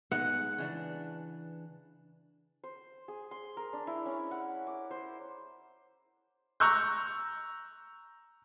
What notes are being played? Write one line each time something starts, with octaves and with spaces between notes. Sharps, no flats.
G#3 B3 D#4 F#5
C#3 E3 D4
C5
G#4
C6
A#4
D4
E4
C#4
F#5
D6
C5
A#5 C#6 E6 F#6 G6